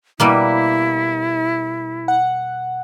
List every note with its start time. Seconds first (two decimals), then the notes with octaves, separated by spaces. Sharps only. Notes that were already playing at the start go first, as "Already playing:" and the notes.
0.20 B2 G3 A#3 E4
2.08 F#5